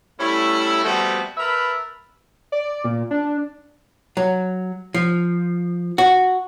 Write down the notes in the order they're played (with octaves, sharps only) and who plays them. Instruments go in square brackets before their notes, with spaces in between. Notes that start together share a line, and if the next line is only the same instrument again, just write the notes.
[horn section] G3 A3 C#4 E4
F3 G3 A3 B3 C4 F#4
A#4 B4 E5 A5 B5
[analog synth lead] D5
A#2
D4
[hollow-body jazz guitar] F#3
F3
F#4